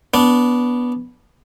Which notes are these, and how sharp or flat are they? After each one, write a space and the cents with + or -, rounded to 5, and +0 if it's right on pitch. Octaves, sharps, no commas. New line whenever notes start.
B3 -5 D4 -25